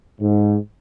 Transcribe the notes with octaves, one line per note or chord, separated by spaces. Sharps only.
G#2